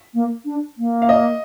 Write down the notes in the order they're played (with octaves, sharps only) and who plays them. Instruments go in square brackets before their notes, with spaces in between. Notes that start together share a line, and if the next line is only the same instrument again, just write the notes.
[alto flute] A#3
D4
A#3
[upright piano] F5
D#5